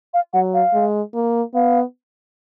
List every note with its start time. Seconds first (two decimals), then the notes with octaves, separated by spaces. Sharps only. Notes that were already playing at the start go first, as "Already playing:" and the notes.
0.14 F5
0.33 F#3 F#5
0.54 F5
0.74 G#3
1.14 A#3
1.54 B3 F5